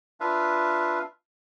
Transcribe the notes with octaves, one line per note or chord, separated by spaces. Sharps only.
D4 F4 B4 E5 F5